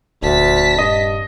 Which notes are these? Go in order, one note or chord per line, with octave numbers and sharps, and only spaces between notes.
D#1 D2 A5 B6
G2 D#5